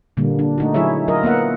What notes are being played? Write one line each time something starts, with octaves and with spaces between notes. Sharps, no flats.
A#2 D3 G3 A#3
D4
A3 D#4 F#4
F#3 E4 G#4 C#5 E5
F#3 F4 A#4 D#5
A#3 B3 E5 F#5